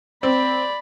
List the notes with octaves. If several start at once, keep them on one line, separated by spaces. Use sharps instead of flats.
C4 D5 B5